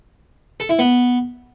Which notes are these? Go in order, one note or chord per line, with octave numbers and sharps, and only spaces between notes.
A4
E4
B3